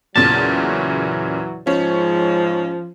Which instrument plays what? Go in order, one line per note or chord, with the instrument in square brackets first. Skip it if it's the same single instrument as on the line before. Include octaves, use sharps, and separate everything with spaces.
[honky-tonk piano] E2 A#2 C#3 [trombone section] E3 F#3 [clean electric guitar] A5
[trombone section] G#2 G#3 [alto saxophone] F3 [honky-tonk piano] C#4